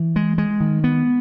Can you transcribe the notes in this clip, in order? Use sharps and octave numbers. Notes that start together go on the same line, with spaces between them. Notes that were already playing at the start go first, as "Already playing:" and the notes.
Already playing: E3
G#3
G#3
D#3
B3